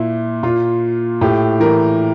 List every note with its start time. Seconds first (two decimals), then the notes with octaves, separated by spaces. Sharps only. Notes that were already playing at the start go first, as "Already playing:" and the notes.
Already playing: A#2 E4
0.43 A#2 F4
1.21 A2 G4
1.60 E3 A#4